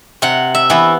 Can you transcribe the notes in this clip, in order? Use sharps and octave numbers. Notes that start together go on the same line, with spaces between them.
C3 F#5
E5
E3 B3 E4